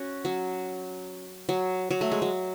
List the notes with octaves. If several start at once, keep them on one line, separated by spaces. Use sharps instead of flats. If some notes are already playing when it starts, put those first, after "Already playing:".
Already playing: C#4 F#4
F#3
F#3
F#3
A3
G#3
F#3